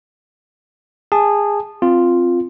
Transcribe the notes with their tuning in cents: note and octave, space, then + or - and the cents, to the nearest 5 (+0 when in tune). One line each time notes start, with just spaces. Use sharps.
G#4 -20 A5 -10
C4 +0 F4 +0